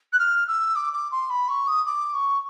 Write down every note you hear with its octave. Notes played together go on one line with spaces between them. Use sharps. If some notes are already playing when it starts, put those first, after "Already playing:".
F#6
F6
E6
D6
D6
C6
B5
C#6
D#6
D6
C#6